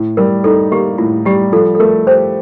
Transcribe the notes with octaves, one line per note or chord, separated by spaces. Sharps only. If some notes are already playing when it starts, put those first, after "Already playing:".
Already playing: A2
G3 A#4
D#4 A4
A#3 G4
A2 F4
G3 G4
F3 A4
A4
A3 A#4
G4 C5